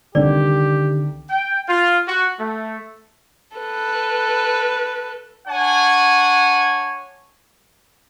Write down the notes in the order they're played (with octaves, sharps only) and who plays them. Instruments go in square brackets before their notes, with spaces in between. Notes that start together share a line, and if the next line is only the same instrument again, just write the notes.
[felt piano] C2 D#3 [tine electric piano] D3 [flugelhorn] G4 [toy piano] D5
[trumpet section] G5
F4
F#4
A3
[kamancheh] A4 B4
[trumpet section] D4 C#5 F#5 G#5